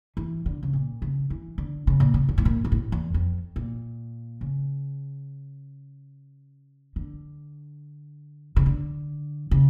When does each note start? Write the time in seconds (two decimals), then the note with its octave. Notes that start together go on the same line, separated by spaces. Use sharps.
0.17 E3
0.46 D3
0.63 C#3
0.73 A#2
1.02 C#3
1.30 E3
1.58 D3
1.87 C#3
2.00 A#2
2.14 C#3
2.29 A#2
2.38 A2
2.45 A#2
2.65 A#2
2.72 A2
2.92 E2
3.14 F2
3.56 A#2
4.41 C#3
6.96 D3
8.56 C#3
8.66 D3
9.51 C#3